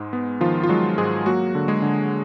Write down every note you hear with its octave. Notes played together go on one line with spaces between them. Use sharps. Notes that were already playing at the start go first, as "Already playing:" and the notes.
Already playing: G#2 G#3
B3
D#3 F3 F4
F4
F#3 G#3 F#4
G#2 G#3 G#4
F#3 A#3 F#4
D3
G#3 G#4
D3